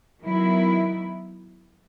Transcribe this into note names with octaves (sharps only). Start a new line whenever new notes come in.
D#3 F#3 B3 E4